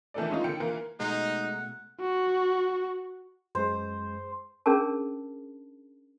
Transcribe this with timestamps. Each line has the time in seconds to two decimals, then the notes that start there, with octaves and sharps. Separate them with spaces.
0.14 D#3 E3 A3 D4 A4 D5
0.30 G#3 C#4 D#4 F4
0.44 D3 D#3 G5 C#7
0.60 E3 A#3 F4 A#4
1.00 B2 G#3 A3 D#4 F#5
2.00 F#4
3.55 F#2 G#3 G#4 C5
4.66 C#4 D4 G#4 A#4 A5